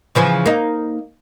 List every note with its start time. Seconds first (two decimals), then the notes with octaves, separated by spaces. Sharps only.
0.15 C#3 E3 F3
0.46 A#3 D#4